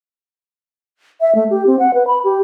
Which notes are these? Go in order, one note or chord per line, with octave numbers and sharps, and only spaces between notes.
E5
A3
G4
C4
F#5
B4
B5
G4